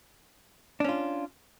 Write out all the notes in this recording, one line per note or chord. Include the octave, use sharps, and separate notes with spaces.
C#4 D4 F4